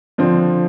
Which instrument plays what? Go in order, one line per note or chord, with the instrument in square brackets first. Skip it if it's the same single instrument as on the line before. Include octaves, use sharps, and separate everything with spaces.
[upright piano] D3 F3 C4